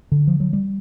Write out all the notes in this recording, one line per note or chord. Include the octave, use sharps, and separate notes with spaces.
D3
F3
F#3
G3